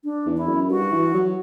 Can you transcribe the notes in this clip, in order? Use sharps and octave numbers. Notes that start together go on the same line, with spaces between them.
D4
E2
E4
F#2
G2 F#4
E3
F#3